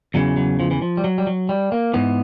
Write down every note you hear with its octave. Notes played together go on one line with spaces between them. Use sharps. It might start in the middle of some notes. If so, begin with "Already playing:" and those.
E2 C#3 E3 F#3
F#3
F3
E3
F3
G3
F#3
G3
F#3
G3
A#3
G#2 E3 B3